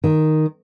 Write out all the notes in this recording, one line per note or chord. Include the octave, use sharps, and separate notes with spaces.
D#3